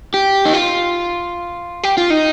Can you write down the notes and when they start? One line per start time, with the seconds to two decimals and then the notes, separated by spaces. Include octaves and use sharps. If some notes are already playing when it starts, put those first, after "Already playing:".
0.14 G4
0.45 D#4
0.53 F4
1.83 G4
1.97 F4
2.10 D#4